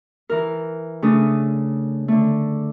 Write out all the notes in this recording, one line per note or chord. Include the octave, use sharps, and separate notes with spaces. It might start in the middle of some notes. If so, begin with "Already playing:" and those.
E3 A#4
C#3 A3 D4 D#6
D3 A3